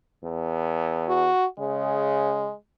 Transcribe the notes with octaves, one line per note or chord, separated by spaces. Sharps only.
E2
F#4
C#3 G#3